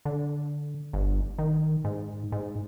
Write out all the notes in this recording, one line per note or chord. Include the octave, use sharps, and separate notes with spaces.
D3
G1
D#3
G#2
G#2